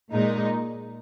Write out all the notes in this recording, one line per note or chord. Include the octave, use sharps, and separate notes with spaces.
A#2 G#3 D#4